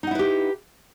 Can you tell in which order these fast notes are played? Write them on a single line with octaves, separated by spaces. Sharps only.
D#4 F#5 E4 B4 G4